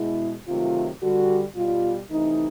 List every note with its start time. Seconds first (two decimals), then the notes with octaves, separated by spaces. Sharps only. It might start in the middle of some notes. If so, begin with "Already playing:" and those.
Already playing: B2 G#3 E4
0.47 C3 D#3 F#3 A3 F4
1.01 D3 G3 F#4
1.56 B2 G3 F4
2.10 C3 E3 A3 D#4